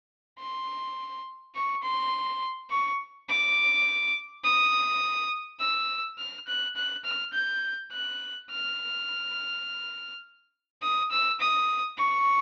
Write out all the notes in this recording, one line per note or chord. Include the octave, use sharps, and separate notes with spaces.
C6
C#6
C6
C#6
D6
D#6
E6
F6
F#6
F#6
F6
G6
F#6
F6
D#6
E6
D#6
C#6